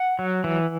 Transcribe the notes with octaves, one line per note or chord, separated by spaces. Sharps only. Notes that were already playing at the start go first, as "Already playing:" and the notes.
Already playing: F#5
F#3
E3